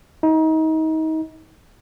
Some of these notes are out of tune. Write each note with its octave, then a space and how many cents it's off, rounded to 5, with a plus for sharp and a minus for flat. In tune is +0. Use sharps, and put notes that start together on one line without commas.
D#4 +30